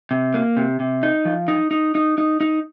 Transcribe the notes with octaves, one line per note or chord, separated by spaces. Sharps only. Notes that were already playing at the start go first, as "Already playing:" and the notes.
C3
A#3
C3
C3
D#4
F3
D#4
D#4
D#4
D#4
D#4